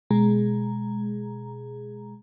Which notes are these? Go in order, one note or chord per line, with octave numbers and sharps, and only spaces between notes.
B2 G#3 G#4 A#5